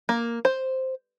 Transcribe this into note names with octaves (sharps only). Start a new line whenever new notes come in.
A#3
C5